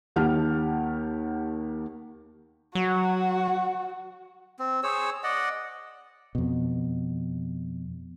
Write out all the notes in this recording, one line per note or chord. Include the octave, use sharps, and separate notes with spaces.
D#2 D#3 G4 F#5 A5 F6
F#3 F#4
C4
G#4 C5 C#5 E6
D5 D#5 F#5
F2 B2